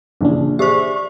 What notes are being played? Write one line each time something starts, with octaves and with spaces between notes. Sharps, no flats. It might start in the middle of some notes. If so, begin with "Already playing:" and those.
A#1 C#3 E3 D4
G4 G#4 C5 D5 E5 C#6